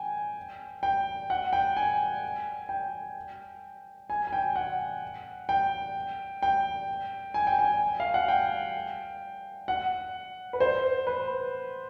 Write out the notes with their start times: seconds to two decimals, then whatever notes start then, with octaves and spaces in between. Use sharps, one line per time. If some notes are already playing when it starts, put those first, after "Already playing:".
Already playing: G5 G#5
0.83 G5
1.30 F#5
1.53 G5
1.77 G#5
2.69 G5
4.10 G#5
4.27 G#5
4.33 G5
4.56 F#5
5.49 G5
6.42 G5
7.34 G#5
7.47 G5
7.59 G#5
8.00 F5
8.14 F#5
8.28 G5
9.68 F#5
10.53 B4
10.60 C5
11.07 B4